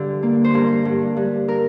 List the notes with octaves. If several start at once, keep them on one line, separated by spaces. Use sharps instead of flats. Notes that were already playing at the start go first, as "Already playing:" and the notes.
Already playing: G2 D3 G4
A#3
C5
G2 A#4
G2
G2
A#4